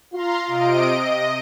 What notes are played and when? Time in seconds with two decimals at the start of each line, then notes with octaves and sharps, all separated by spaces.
0.12 F4 F5 A#5 C6
0.48 C3 D#5 D7
0.91 D#5